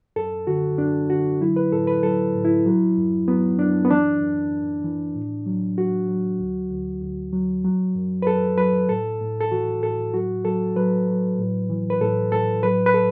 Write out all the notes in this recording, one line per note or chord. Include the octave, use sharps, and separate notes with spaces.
F#2 A4
D3 F#4
F#2 D4
D3 F#4
F#3 E4
B4
A2 A4
B4
F#3 A4
A2
E4
F#3
F#2
F#3 B3
F#2 D4
B3
E3 D4
F#2
F#2
E3
A2
F#3
F#3 F#4
F#3
D2
D2
D2
F#3
F#3
F#2
B4
F#2 A4
F#3 B4
A2 A4
A2
A4
E3 F#4
A2 A4
F#3 F#4
F#3 A4
F#3 B4
F#3
A2
E3
B4
A2 A4
A2 A4
F#3 B4
B4
A4